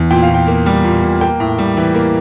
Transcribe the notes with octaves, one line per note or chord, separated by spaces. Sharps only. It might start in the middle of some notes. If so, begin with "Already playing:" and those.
Already playing: E2
A#2 G5
F5
A#2 G5
A#3
G3
A#2
A#2
A#3 G5
A2
G3
E3
A#3